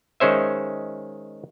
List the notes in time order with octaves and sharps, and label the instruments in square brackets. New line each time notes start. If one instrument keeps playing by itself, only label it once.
[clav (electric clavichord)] D#3 G#3 C#4 C5 E5